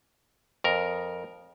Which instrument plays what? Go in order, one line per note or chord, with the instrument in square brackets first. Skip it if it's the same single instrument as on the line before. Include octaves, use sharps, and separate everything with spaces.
[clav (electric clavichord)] F2 A#4